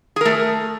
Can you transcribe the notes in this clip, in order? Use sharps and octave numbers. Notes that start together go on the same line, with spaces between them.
A3 G#4 A#4